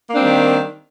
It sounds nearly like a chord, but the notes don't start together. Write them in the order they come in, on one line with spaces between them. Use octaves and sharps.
A#3 D4 C4 G3 D#3